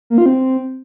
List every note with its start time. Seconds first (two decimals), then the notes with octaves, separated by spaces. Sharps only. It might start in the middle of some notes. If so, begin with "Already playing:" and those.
0.10 A#3
0.18 F4
0.26 C4